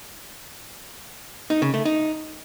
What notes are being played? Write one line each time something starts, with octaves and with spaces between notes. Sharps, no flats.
D#4
C#3
A3
D#4